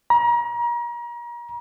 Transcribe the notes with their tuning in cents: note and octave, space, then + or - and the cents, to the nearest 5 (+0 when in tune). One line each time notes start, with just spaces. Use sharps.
A#5 +35